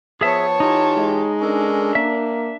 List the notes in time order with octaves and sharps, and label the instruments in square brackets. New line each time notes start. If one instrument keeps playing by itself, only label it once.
[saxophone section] F3 B3 [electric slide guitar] G#4 E5 [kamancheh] C#5 A5
[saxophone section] E3 F4 G4 [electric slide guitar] D#4
[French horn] G#3
[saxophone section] C#4 A4 A#4 [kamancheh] D4
[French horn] A#3 [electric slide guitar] E5